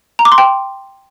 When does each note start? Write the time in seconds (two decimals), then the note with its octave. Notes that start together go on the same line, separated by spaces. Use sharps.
0.19 A#5
0.25 D6
0.32 C6
0.38 G5